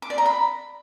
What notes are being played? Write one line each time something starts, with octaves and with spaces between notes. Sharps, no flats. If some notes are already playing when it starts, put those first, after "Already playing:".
D6
D5
A#5
B5